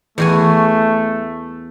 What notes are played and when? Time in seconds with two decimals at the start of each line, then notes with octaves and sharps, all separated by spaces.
0.18 E2 A3 F#4 G#5